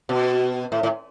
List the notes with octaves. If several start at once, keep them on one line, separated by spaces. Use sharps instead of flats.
B2
A2
A2